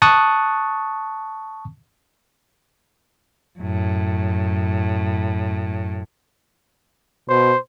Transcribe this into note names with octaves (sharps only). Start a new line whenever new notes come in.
A5 C#6 D#6 F#6
F#2 A2
B2 C5